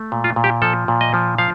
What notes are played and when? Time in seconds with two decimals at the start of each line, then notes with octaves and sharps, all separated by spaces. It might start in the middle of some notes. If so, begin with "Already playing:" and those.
Already playing: A3
0.12 A#2
0.24 F4
0.36 A#2
0.44 G4
0.62 F3 A4
0.88 A#2
1.01 D#5
1.14 F3
1.38 F3 F5